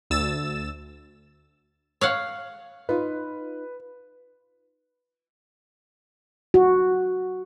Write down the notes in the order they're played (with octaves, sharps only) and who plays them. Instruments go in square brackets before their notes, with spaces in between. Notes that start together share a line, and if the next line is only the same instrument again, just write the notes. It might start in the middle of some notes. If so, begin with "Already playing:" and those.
[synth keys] D2 E6 A6 E7
[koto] C#5 F5 F#5
[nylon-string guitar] D#4 F4 [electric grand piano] B4
[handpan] F#4